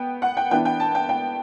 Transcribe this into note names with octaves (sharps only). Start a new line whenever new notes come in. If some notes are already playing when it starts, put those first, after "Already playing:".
Already playing: B3 G5
F#5
G5
E3 B3 D4 G5
G5
A5
G5
G5